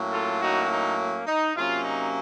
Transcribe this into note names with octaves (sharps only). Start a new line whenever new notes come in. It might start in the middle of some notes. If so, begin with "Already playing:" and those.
Already playing: A2 F#3 A#3 C#4
F4 A4
D#4 F#4
D#4
D#4
C3 F#3 A#3 C#4 F4
D#4